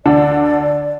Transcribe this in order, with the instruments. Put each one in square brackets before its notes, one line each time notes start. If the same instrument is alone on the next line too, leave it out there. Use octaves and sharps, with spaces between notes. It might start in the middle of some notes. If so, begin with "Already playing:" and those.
[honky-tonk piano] D2 D3 D4 [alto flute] D5